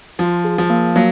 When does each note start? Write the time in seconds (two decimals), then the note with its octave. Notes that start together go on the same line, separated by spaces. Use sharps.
0.19 F3 F4
0.45 G#4
0.58 F3
0.70 A#3
0.96 F#3 A#3